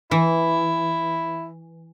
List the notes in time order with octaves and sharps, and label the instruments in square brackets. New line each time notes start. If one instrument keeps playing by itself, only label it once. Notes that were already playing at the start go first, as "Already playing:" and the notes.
[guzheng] E3 [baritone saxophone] E4